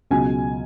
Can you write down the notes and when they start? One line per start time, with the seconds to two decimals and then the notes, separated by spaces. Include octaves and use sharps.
0.11 C#2 B2 F#3 G#5